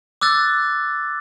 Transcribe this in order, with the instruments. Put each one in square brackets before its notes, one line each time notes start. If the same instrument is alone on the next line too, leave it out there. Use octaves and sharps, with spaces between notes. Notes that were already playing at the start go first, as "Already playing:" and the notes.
[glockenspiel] D6 E6 F#6 A6